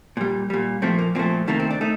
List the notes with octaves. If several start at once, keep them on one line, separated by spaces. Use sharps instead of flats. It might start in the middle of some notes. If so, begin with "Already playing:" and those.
A#2 G3
A#2 G3
A#2 F3 A3 C4
A#3
A#2 F3 A3 C4
C3 D#3 A3 A#3
C4
D4
A3 D#4